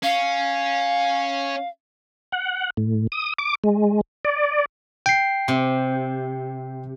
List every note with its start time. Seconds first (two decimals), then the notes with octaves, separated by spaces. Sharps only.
0.03 C#4 F5
2.32 F#5
2.77 A2
3.12 D#6
3.38 D6
3.64 G#3
4.25 D5
5.06 G5 C7
5.48 C3